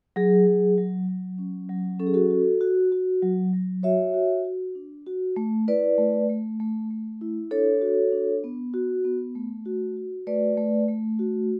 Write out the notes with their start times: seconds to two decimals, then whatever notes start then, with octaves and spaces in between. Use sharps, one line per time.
0.16 F#3 G#4
0.47 F#3
0.78 F#3
1.09 F#3
1.38 C#4
1.70 F#3
2.00 C#4 A4
2.07 G#4
2.14 F#4 A4
2.30 F#4
2.61 F#4
2.92 F#4
3.22 F#3
3.53 F#3
3.83 F#4 C#5 E5
4.14 F#4
4.45 F#4
4.75 D4
5.07 F#4
5.36 A3
5.68 E4 B4 D5
5.98 A3
6.29 A3
6.60 A3
6.90 A3
7.21 E4
7.51 D4 A4 C#5
7.82 F#4
8.12 D4
8.44 B3
8.74 F#4
9.05 B3
9.35 A3
9.66 F#4
9.97 F#4
10.27 A3 B4 D5
10.57 A3
10.89 A3
11.19 F#4